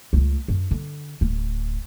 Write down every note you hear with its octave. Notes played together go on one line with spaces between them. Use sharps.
C#2 A3
F#2
D3
D1